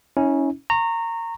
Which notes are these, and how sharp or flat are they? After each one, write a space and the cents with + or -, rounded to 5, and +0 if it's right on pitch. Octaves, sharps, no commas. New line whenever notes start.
C#4 +0 E4 -45
A#5 -20 C#6 -25